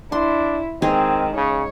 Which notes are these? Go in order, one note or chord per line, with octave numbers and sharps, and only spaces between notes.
D4 E4 C6
D#3 G#3 C4 D#4 G#4
C#3 C#5